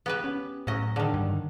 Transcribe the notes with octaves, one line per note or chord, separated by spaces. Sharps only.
B3 G4 B4
C#4
A2 F#3 C#4 D#5
D3 D#3
G2